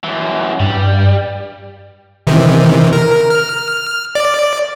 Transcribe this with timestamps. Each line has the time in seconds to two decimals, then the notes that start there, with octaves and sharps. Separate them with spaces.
0.04 F#2 E3
0.60 G2 G3
2.27 C3 D#3 E3
2.93 A#4
3.30 F6
4.15 D5